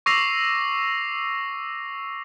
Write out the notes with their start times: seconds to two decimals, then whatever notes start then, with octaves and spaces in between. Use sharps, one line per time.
0.06 C#6 D6 E6 A#6 C7 F7